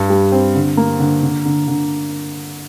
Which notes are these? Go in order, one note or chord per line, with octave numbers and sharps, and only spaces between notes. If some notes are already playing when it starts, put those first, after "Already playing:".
Already playing: G2
G3
C4
D3
A#3
D3
D3
D3
D3